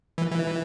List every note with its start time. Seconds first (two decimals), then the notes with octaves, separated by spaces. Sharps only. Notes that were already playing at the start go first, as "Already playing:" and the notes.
0.18 E3
0.31 E3